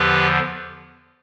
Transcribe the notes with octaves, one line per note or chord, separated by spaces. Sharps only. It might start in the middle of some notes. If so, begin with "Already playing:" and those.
Already playing: E2 D3 F3 G4 B4